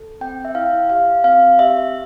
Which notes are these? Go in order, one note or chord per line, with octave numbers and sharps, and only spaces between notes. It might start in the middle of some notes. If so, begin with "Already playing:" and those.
Already playing: A4
C4 G5
E5
E4 F5
G4 F5
C4 F5
G4 E5